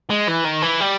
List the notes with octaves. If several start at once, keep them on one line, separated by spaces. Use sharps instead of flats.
G#3
E3
D#3
E3
G3